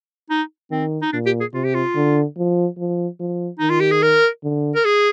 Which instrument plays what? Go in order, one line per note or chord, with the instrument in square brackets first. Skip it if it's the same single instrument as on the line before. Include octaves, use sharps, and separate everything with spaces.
[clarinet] D#4
[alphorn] D#3 [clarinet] C4
[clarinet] D#4
[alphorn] A#2 [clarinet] D4
[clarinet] G4
G#4
[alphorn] C3 [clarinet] F4
[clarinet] G4
F4
[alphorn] D3
F3
F3
F3
[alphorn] D#3 [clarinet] D#4
[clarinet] F4
G4
G#4
A#4
[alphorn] D3
[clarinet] A#4
G#4